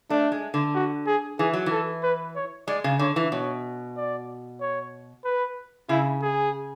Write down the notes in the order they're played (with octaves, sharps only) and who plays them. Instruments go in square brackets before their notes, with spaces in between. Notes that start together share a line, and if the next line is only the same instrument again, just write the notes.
[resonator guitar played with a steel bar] A3 [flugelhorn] D4
[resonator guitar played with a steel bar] G#3
D3
[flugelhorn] F#4
G#4
[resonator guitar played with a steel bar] E3 [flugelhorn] G#4
[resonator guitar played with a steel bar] F#3
[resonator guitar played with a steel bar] E3 [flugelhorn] A4
[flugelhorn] B4
C#5
[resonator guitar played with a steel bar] G#3 [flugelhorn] D5
[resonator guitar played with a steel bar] C#3
[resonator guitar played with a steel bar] D3 [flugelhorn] C#5
[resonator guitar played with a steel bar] E3
[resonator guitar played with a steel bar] B2 [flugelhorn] C#5
[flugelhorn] D5
C#5
B4
[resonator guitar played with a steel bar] C#3 [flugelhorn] E4
[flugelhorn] G#4